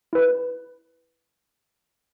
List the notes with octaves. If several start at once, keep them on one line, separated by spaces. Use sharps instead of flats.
E4 B4